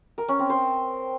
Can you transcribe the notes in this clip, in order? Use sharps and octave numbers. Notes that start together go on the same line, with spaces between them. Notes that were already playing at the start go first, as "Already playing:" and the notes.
A#4
C#4
C4
C5